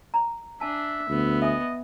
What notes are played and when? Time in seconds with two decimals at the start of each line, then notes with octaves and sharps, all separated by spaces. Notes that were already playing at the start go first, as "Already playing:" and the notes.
0.14 A#5
0.61 D4 E5 G#5 A5
1.09 D2 B3
1.42 D#5 E5 G#5 D#6